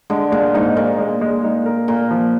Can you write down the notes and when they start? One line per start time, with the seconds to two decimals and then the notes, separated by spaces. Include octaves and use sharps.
0.10 D3 G#3
0.32 A#2 G#3
0.54 G#2 D#4
0.77 A#2 A#4
0.98 G#3
1.21 G#3
1.44 D#4
1.66 A#4
1.88 A#2 A#4
2.10 F3